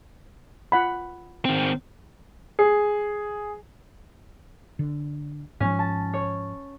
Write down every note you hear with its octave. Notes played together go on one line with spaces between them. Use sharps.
F4 F#5 B5
D#3 C4
G#4
D3
G#2 F3 C#4
A5
C#5